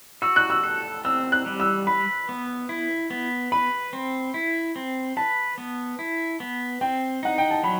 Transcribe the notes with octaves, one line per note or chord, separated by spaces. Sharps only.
F#4 E6
F#6
E6
A4
C4 E6
F#6
G3
E6
B4 B5
B3
E4
B3
B4 B5
C4
E4
C4
B4 A5
B3
E4
B3
C4 G5
D#4 F#5
G5
A5
F#3 B5